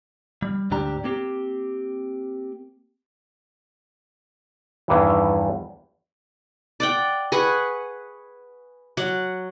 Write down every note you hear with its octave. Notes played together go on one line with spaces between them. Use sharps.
G3
D2 G#2 D4 G4 A#5
A#3 C4 G4
E2 G2 D#3 E3
D5 F#5 G5
G#4 B4 F#5 C#6
F#3 F#5